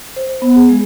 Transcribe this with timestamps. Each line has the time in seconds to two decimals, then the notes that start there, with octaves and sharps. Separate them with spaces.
0.16 C5
0.42 B3
0.56 G#4
0.69 G#3